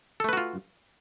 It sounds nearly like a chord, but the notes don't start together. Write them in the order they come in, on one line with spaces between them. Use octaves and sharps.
A4 A3 B4 F#4 F4